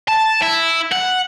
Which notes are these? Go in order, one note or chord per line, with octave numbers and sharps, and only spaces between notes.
A5
E4
F#5